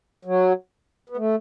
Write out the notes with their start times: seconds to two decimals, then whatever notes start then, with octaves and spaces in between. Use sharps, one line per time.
0.25 F#3
1.09 B3
1.17 A3